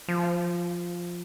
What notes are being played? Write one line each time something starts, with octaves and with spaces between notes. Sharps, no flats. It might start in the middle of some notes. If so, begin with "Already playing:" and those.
F3